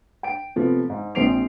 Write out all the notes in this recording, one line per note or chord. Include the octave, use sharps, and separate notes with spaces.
G5 D7
C3 F3 A3 B3
G#2
A#1 G#3 C4 C7 D7 F7